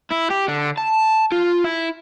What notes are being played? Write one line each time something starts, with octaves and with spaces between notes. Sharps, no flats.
E4
G4
D3
A5
F4
E4